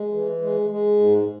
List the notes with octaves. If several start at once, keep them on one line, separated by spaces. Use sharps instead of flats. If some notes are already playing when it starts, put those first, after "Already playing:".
Already playing: G#3
E3
G#3
G#3
G#2